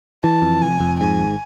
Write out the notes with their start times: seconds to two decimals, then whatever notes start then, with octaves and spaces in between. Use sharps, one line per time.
0.24 E3 A5
0.42 F2
0.62 F1 G#5
0.80 F2
1.00 G#2 G#5
1.19 G#1